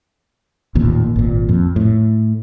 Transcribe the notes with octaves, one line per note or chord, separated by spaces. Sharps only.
A1 D#2 A#2
G#1 A#2
F2
A2